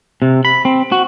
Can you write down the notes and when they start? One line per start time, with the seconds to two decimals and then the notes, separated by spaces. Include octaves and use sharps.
0.22 C3
0.45 B5
0.65 C4
0.92 F#4